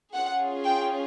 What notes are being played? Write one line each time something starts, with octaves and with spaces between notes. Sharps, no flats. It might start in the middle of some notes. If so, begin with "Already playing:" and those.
C#4 F4 G#4 F#5
G5